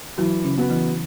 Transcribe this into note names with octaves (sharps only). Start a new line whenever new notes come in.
E3 F#3 F#4
C#3 C#4
B3 F#4
E3 E4